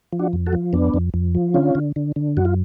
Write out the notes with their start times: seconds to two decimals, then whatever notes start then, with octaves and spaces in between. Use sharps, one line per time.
0.12 F3
0.19 D4 F#4
0.33 F2
0.46 F#4 A4
0.53 F3
0.73 F2 B3 D4
0.94 F2
1.14 F2
1.35 F3
1.54 D3 C#4 F4
1.75 D3
1.96 D3
2.16 D3
2.37 F#2 F#4
2.45 F4